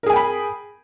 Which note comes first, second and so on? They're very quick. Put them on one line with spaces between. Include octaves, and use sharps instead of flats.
A#4 G#4 G#5 G5 B5